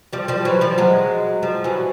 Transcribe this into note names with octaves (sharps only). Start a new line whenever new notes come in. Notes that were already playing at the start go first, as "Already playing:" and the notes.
F3 G3
F3 G3
E3 F#3
F3 G3
F#3 G#3
F3 G3
E3 F#3